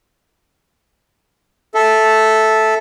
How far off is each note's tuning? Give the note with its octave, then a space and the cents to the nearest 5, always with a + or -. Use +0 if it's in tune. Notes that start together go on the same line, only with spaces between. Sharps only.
A4 -5 E5 -5